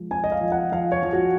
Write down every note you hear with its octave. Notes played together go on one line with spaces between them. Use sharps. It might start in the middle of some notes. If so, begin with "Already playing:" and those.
Already playing: F3 G#3
C4 G#5
D#5
F5
F3
F#5
F3 F5
C#5
F3
F#4